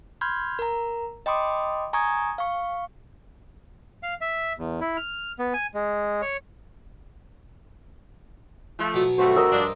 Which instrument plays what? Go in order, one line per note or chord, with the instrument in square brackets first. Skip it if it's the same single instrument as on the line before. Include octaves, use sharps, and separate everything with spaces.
[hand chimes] B5 C6 F6 G6 G#6
A#4 A#5
D#5 G5 B5 C6 D6 D#6
G#5 A#5 C#6 D#6 G#6
F5 C#6
[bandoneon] F5
E5
E2
E4
F6
B3
G#5
G#3
C#5
[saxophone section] F3 A3
[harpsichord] B2 F#3
[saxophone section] G2 D3 A3 [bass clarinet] F#4 [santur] C5
[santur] A#4 D#5 E6
[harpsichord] G2 [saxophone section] F3 D4